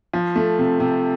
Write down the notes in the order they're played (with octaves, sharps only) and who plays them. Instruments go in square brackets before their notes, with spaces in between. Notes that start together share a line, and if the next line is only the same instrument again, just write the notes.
[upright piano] F3
A3
C3
C3